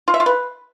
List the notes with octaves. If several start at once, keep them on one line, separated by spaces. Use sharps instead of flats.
F4
E5
F4
B4